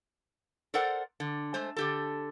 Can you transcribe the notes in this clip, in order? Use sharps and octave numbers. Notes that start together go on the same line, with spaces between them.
A4 A#4 C5 D5 F#5
D3
G#3 A3 C5
D3 G4 A4